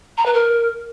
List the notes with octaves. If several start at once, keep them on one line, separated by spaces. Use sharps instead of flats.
A#5
B4
A#4